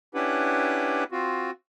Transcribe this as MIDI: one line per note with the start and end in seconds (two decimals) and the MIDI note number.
0.15 1.04 61
0.15 1.04 62
0.15 1.04 64
0.15 1.04 67
0.15 1.04 71
0.15 1.04 78
1.12 1.51 60
1.12 1.51 65
1.12 1.51 66